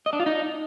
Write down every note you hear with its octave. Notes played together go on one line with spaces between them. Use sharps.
D#5
D4
F4
D#4